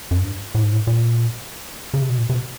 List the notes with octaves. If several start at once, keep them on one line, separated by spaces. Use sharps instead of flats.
F#2
G2
A2
G#2
A2
A#2
C#3
C3
B2
A#2
C3
B2